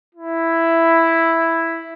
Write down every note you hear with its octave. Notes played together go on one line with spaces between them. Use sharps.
E4